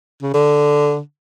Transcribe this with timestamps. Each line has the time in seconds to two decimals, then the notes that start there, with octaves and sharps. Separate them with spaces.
0.22 C#3
0.34 D3